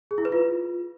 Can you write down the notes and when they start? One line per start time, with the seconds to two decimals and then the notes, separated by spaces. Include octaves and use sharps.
0.11 G#4
0.18 E4
0.25 B4
0.32 F4